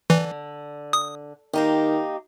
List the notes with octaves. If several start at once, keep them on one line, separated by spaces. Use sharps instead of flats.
D3 E3
D#6
D#3 A#3 D#4 G4